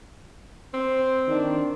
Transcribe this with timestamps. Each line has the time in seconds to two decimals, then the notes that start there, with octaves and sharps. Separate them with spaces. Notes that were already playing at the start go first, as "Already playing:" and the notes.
0.74 C4
1.27 D#3 D4